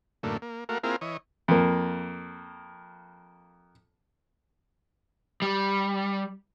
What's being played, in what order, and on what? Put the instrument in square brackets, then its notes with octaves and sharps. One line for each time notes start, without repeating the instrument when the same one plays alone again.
[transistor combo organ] F#2 A2 D3 A3 A#3
A#3
A3 A#3 F#4 A#4 F5
A#3 C4 E4 F4 G#4 A#4
E3 C#5 D#5
[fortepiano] F2 A#3
[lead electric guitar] G3